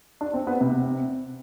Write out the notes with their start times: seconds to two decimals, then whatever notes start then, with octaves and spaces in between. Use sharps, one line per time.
0.21 D4
0.34 C4
0.47 B3
0.61 C3